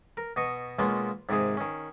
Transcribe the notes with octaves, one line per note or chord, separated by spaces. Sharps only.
A#4
B2 D#5 C#6
B2 G#3 A#3 C#4 F4
G#2 C3 D#3 G#4
D#3 C#4